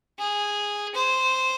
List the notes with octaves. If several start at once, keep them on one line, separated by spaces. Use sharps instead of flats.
G#4
C5